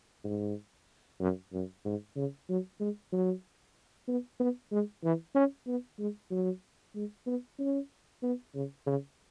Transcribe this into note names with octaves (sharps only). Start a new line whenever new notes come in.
G#2
F#2
F#2
G#2
C#3
F#3
G#3
F#3
B3
B3
G#3
E3
C#4
B3
G#3
F#3
G#3
B3
C#4
B3
C#3
C#3